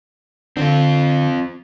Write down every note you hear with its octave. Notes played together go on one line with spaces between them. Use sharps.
D3 C4 F4